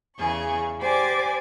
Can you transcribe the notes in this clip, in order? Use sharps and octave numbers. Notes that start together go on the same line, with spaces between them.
E2 C#3 G#4 C#6
G4 C5 D5 G#5 D6